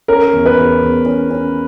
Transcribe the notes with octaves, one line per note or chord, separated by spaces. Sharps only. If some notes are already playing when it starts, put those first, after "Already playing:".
C#4 A#4
E2
B4
E2
E2
C#4
C#4